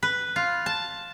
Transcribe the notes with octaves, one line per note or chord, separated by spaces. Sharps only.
B4
F4
A5